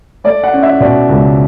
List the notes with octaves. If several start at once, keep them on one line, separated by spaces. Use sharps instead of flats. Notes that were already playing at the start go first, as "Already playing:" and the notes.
A3 D5
F#5
C#4
E5
B2 D5
C#2